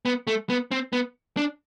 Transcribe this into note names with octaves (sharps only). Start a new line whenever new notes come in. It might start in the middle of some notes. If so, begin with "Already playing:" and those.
B3
A3
B3
C4
B3
D4